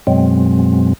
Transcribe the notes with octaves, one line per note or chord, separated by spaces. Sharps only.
F#2 B2 F#3 G#3 C4